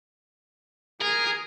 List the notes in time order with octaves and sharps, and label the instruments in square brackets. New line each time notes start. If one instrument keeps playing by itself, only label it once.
[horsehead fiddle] G#4 [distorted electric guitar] A#4